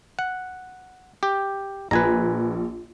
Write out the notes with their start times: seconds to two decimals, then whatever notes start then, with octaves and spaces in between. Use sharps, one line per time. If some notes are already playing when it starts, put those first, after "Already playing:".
0.19 F#5
1.23 G4
1.91 A#1 B4 G#5 A#5